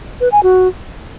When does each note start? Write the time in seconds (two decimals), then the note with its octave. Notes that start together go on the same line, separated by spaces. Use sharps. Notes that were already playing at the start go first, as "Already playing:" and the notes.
0.21 B4
0.32 G#5
0.43 F#4